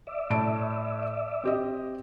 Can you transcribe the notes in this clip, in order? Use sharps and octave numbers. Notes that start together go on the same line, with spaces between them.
D5 E5
A2 A5 D7
C4 G4 D#5